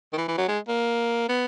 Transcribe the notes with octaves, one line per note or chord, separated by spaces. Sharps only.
D#3
E3
E3
F#3
G#3
A#3
B3